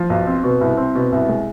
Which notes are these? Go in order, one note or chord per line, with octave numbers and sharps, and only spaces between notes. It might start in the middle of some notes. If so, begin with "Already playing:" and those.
Already playing: F3
B1
C4
B2
C2
C4
B2
C2
G#3